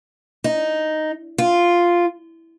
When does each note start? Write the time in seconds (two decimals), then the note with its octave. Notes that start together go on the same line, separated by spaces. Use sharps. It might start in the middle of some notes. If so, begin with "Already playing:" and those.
0.44 D#4
1.38 F4